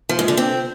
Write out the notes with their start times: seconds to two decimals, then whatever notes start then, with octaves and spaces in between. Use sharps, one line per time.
0.09 F3
0.19 G#2
0.28 D3
0.37 C4